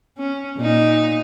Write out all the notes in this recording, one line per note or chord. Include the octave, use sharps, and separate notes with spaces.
C#4
A#2 D#4